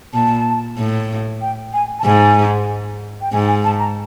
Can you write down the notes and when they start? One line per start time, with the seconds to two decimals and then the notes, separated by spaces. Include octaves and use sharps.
0.14 A#2 A5
0.78 A2
1.41 G5
1.73 G#5
1.99 A5
2.05 G#2 G#5
3.21 G5
3.32 G#2 G#5
3.48 G#5
3.64 A5
3.79 A#5